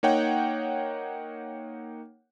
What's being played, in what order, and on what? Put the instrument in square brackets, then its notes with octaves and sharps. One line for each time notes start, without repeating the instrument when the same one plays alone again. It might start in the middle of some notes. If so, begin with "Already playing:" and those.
[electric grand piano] A#3 D#4 C#5 F#5 G5